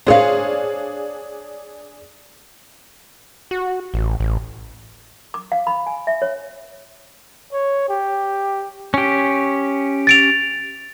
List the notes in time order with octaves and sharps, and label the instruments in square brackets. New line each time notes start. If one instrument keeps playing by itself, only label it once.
[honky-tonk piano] D4 G#4 [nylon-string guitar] C5 C#5 F5
[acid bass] F#4
A1
A1
[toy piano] D6
F5
B5
G#5
E5
C#5
[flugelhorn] C#5
G4
[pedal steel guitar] C#4 G4
[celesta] A6 D7 F7